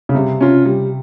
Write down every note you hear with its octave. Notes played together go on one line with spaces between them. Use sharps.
C#3
C3 G3
C#4 F4
G3